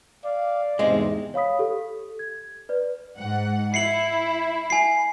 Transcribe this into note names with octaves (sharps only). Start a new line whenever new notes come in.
D5 F5
E2 G#2 C3 G#3 C4 D#5
C#5 F5 B5 D#6 B6
G4 A4
G#6
B4 D5
G#2 F#5
E4 C7 C#7 F#7
G#5 C7